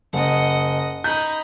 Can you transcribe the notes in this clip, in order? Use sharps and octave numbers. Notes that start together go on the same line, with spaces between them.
F#1 D#5 F#5
D#4 B5 G6